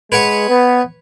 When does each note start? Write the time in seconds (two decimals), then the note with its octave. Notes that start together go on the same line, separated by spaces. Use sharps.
0.12 G#3 B4 C#5 F#5
0.49 B3